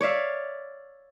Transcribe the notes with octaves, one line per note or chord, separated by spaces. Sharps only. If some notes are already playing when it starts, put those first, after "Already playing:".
C#5 D5 E5 F5